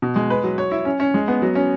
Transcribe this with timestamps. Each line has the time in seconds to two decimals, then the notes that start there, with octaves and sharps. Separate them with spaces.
0.02 B2
0.16 G#3
0.30 B4
0.44 F#3
0.58 C#5
0.71 E4
0.85 C#4
1.00 C#4
1.14 G#3
1.28 B3
1.42 F#3
1.55 C#4